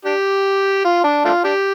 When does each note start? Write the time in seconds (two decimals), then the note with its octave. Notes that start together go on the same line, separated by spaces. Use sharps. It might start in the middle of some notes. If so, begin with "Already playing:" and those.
0.05 D4 G4
0.85 F4
1.04 D4
1.25 A3 D4 F4
1.44 D4 G4